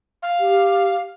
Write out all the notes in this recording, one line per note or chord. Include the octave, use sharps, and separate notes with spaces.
F5
G4